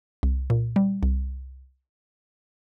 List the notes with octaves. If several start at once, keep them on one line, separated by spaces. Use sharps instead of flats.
C2
A#2
G3
C2